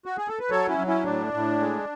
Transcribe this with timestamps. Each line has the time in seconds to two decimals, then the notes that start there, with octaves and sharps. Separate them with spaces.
0.06 F#4
0.18 G#4
0.28 A4
0.39 B4
0.50 F#3 A4 C#5
0.68 C#4 E4
0.78 F#3
0.87 C#4 E4
1.05 A2 D4
1.33 A2
1.61 G#3